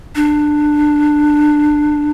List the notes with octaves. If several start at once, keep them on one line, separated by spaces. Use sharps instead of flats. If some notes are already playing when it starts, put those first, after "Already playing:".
D4